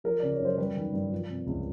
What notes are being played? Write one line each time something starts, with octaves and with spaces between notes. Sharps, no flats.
F3 A#4
C#3 D5
C#5
F#2
C5
G3 B4
D#3
G2
F3
C3
C#2